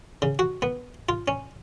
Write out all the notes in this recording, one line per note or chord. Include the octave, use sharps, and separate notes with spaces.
C#3
F#4
B3
F4
C#4